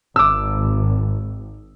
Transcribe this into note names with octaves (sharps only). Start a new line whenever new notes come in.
G#1 D6 E6